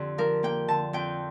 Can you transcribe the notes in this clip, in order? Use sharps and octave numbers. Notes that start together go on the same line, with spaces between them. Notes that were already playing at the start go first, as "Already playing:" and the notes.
Already playing: F2 D3 G4
F3 A#4
A#3 G5
D3 A5
F2 G5